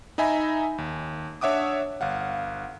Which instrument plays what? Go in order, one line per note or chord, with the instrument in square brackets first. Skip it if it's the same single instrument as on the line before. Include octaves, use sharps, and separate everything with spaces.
[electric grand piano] D#4 D#5 E5 G#5 A#5 B5
D#2
D4 C#5 E5 F#5 D6 D#6
G1 F5 F#5